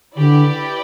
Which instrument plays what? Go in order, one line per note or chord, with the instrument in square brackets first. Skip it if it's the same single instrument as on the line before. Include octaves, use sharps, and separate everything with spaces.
[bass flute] D3 [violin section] E4 G4 B4 D5